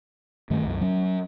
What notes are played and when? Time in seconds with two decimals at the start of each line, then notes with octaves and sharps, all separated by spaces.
0.50 G2 D#3 A3
0.63 C2 F#2
0.81 F#3 C#4